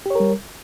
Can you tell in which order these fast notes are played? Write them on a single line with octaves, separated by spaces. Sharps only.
G4 C#5 A#4 G3